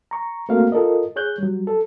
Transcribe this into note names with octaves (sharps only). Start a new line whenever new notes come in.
A#5 C#6
A3 A#3 C4 F#4 A#4 F5
F4 A4 A#4 D#5
G#4 C#5 F#6 G6
F#3 G3
A4